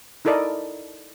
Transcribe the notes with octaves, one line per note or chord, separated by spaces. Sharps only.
D#4 E4 A4 A#4 D5 D#5